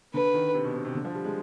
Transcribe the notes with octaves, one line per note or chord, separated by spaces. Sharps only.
D3 B4
D#3
C3
B2
C3
C3
D3
F3
G3
G#3